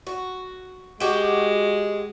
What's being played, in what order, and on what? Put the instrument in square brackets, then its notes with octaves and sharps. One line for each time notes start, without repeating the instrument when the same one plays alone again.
[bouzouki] F#4
[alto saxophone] G#3 [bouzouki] F#4 G4